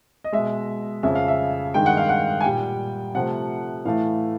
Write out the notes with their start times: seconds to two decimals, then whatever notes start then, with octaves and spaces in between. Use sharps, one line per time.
0.24 D#5
0.32 B2 G#3 E5
1.03 F2 C#3 F3 E5
1.15 F5
1.28 E5
1.74 G2 D#3 G#3 G5
1.86 F#5
1.97 F5
2.09 F#5
2.41 G#5
2.44 A#2 G3 G5
3.14 C3 F3 A3 F#5
3.85 A2 E3 A3 F5